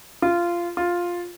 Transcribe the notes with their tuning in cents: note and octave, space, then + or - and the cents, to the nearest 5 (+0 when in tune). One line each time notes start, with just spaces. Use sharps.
F4 -15
F4 +5